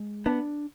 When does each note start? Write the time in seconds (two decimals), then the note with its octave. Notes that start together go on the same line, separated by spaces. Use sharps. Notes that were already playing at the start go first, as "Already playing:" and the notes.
Already playing: G#3
0.26 B3 D4